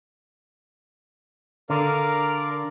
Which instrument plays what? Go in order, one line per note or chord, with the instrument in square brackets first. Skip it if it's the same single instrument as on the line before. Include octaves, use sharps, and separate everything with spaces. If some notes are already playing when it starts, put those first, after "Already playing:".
[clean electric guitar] D3 [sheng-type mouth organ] A#4 D5 F5